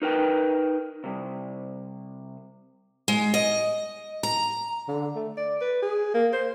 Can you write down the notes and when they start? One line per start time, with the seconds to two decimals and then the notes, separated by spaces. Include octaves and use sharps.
0.02 D#4 A#4 B4 G5
1.04 C3 G3
3.08 G#3
3.34 D#5
4.23 A#5
4.88 D3
5.15 A3
5.37 D5
5.61 B4
5.82 G#4
6.14 A#3
6.33 C5